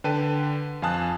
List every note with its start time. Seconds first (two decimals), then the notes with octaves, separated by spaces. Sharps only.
0.04 D3 B4 G5 A5 D#7
0.82 F2 F5 G#5 A5 D#6 F#6